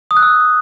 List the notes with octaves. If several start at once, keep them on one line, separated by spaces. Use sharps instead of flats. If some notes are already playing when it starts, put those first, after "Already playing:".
D#6
F#6
E6